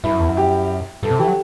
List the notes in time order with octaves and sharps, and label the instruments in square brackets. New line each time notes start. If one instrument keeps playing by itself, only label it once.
[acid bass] G2 [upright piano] E4
[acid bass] F#2
E2
F#2
[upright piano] G4
[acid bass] G2 [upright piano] A4
[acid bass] C3
[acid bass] E3 [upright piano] G4
[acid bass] F#3